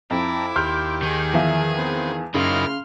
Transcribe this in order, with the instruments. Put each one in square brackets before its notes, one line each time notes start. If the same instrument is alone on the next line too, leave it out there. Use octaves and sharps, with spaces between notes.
[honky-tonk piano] F2 [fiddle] E4 D6 [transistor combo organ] A5 A#5
[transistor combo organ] D#2 G4 [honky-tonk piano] C6 F6 G6
[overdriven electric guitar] D#3 [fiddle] G#4
[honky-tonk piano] E2 F3 E5
[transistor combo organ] B3 C4
[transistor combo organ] F#2 D#4 B5 [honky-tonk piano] C#3 [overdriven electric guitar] A#3 E4 [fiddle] C6 F6